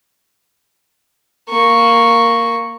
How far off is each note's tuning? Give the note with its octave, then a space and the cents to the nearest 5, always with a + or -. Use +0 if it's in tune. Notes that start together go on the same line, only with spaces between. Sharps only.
A#3 +0 C#6 +0